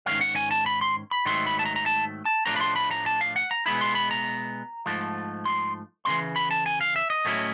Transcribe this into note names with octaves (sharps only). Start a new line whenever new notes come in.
G#2 D#3 F#3 A#3 C#4 F5
F#5
G#5
A5
B5
C6
B5
G#2 D#3 F#3 A3 C6
B5
A5
A#5
A#5
A5
A5
A2 F3 A3 D4 A#5
B5
C6
B5
A#5
A5
F5
F#5
A#5
B2 G#3 B3 E4 B5
C6
B5
A#5
G#2 F3 A3
C6
E2 C#3 E3 C6
B5
A5
G#5
F5
E5
D#5
A2 F#3 A3 C#4 E4